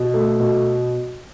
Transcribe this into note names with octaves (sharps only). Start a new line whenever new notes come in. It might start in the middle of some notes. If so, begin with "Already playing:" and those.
Already playing: B2
A3
B2